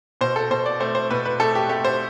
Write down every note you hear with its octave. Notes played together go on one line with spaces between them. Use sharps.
B2 C5
A4
B2 C5
D5
A3 C5
C5
B2 B4
B4
A3 A4
G4
A3 G4
C5